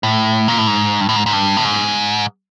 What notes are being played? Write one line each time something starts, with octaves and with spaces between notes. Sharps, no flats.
A2
A#2
A2
G#2
G2
A2
G#2
G#2
G2
A2
G#2